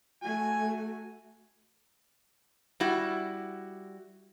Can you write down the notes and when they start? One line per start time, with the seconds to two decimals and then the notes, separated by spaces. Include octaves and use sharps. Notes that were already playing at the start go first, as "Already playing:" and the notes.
0.23 A3 F#4 G#5
2.80 G3 E4 F#4